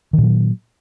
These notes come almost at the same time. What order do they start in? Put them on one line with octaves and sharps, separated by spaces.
D#3 A#2 F#3